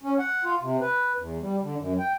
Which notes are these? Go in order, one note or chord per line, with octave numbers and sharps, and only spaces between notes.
C#4
F#5
F4
C3
B4
E2
G3
D3
F#2
G5